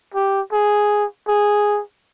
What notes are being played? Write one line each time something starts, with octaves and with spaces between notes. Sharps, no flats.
G4
G#4
G#4